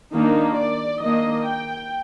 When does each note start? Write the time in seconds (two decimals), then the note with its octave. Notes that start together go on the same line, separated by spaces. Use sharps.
0.12 D#3 A#3 D4 D#4
0.56 D5
1.01 D#3 A#3 D4 D#5
1.46 G5